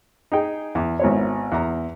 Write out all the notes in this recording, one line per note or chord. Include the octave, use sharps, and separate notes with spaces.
D#4 G#4 G5
E2
G#1 B3 E4 C5 C#5
E2 A#5